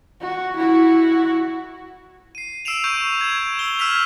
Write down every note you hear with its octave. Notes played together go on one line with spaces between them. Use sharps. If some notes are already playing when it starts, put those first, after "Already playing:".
F#4
E4 F#4
C7 D#7
E6 C7 D7 E7 F7
C#6 G6 D7 D#7
G#6 E7
E6 G7
E6 F6 G#6 B6 E7 F7